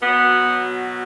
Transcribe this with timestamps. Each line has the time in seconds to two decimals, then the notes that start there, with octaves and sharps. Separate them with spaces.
0.02 B2 F#3 B3